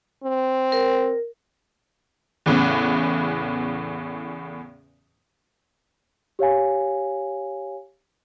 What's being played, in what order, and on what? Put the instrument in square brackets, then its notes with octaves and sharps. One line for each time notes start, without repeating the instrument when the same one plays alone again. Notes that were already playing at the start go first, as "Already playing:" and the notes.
[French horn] C4
[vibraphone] A#4
[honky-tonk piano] E2 A2 C#3 B3
[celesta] G4 C#5 F5 G#5